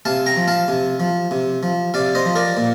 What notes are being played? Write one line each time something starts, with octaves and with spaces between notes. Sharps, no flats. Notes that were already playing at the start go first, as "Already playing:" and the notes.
C3 F5 A5
G5 A#5
F3
F5 A5
C3
F3
C3
F3
C3 D5 F5
C5 D#5
F3
A#4 D5
A#2